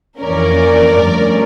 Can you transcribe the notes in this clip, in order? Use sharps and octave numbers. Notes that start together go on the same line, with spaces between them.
F2 E3 A#3 C#4 A#4 D5
G2 D3 F3 A3 C#4